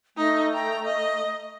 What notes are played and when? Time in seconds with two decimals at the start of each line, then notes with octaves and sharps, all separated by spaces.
0.17 A3 D#4 D#5
0.54 G5 A#5
0.84 D#5